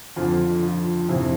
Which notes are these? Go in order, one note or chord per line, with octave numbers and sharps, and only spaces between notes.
F2 D3 F3 F4
F4
F2 C3 F3 E4